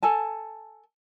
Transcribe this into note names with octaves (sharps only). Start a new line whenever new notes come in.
A4 G#5 A5